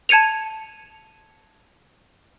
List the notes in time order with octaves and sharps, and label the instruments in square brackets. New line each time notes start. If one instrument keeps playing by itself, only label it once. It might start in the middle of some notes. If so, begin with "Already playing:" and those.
[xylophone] A5 G#6 C#7 D#7 F7